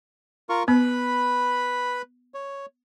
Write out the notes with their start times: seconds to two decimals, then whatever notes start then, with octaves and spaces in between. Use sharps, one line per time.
0.49 F4 A#4 C#6
0.68 B3 B4 B5
2.34 C#5